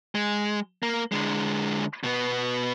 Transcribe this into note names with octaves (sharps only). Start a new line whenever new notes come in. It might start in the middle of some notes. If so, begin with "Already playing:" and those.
G#3
A#3
D3 G#3
B2 B3